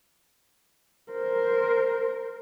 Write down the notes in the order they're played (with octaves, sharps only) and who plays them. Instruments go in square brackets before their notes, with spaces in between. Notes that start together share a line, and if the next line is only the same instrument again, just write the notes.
[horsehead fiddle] A#4 C5